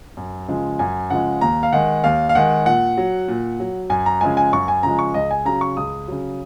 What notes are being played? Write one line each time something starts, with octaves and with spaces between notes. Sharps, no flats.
F#2
C#3 F3 G#3
F#2 G#5
C#3 F3 G#3 F#5
D#2 A#5
F5
D#3 G#3 F#5
D#2 F5
F5
D#3 G#3 F#5
A#2 F#5
F#3
A#2
F#3
F#2 G#5
A#5
C#3 F3 G#3 G#5
G#5
F#2 C#6
G#5
C#3 F3 G#3 A#5
C#6
C#2 D#5
G#5
C#3 F#3 A#5
C#6
C#2 D#6
C#3 F#3